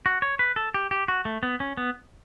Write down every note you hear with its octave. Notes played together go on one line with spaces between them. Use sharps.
F#4
C#5
B4
A4
G4
G4
F#4
A3
B3
C#4
B3